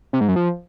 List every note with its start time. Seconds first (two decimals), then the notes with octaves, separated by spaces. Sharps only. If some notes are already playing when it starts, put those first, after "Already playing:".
0.13 C3
0.21 G#2
0.28 F#2
0.36 F3